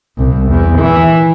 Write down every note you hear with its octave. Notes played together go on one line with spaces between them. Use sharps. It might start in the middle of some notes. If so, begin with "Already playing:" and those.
C2
E2
E3